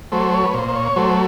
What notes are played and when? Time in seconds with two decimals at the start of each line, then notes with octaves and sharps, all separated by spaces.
0.12 F#3 A3 C5
0.32 C#5
0.45 B4
0.54 A#2 C5
0.68 C5
0.76 C#5
0.96 F#3 A3 C5